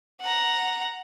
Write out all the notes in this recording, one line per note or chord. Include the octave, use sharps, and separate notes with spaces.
F#5 A#5